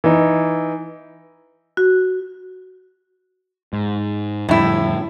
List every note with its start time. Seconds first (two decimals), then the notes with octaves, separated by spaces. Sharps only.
0.04 E3 D#4
1.77 F#4
3.73 G#2
4.49 F2 A2 D3 G3 E4